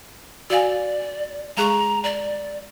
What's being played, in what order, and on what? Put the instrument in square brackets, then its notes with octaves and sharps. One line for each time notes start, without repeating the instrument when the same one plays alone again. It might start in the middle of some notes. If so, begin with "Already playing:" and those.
[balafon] F#4 F5 G#5 [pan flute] D5
[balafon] G#3 G#4 C#6 [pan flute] A#5
[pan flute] D5 [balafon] A#5